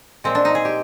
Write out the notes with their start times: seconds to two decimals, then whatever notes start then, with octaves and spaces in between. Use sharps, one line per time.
0.24 A#2 F3 G#3 C4
0.35 D4
0.45 D#4
0.55 G#4
0.65 G4